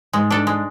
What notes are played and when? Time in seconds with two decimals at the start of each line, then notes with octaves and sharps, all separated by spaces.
0.13 G#2 G#3
0.31 D4 A4
0.47 G#3